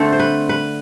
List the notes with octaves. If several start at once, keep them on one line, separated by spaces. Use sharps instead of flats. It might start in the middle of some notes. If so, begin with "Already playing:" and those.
Already playing: D3 A3 C4 A4
C5
B4
B4